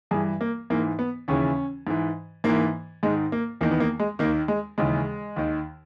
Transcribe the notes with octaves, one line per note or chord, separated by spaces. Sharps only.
G2 E3 G#4
A#3
G#2 E3 A#3
B3
D#2 C#3 E3 C#4
G#2 E3
G#2 E3 A#3
G#2 D#3 G#3
A#3
E2 D#3 A#3
B3
A#3
G#3
D#2 D#3 A#3
G#3
D#2 C#3 E3 G#3
D#2 D#3